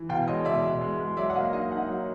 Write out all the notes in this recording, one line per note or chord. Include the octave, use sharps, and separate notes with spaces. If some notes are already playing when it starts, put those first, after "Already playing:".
Already playing: E3
B2 F5 G5
G#3 C#5 D#5
B2 D5 E5
B2
G#3
G#3
F#3 D5 E5
F#5
A#3 D#5 F5
D#4 D#5 F5
D#4 E5 F#5
F#3